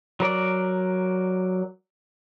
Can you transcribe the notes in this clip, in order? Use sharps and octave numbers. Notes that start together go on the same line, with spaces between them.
F#3 A#4 D5